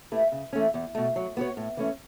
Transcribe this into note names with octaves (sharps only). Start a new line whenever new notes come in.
A3 E4 G4 B4
C#3
E3 A3 C#4
E2
B2 A3
F#3
B3 F#4 C#5
A2
E3 A3 C#4